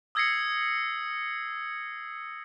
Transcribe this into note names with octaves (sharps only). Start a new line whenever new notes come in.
D#6 E6 G#6 A#6 C7 C#7